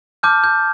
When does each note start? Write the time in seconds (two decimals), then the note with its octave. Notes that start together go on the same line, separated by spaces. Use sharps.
0.23 A5 D6 F6 G6
0.44 G6